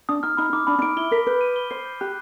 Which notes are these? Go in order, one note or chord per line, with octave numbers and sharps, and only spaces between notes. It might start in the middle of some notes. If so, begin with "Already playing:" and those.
D4 D#6
D#4 F6
D#4 B5
D#4 D6
D4 B5
D4
D#4 D7
E4 G7
A#4 B6
B4 G6
D#7
G7
C5 C7
G6
G4 F#6